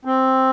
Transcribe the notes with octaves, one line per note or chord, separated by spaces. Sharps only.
C4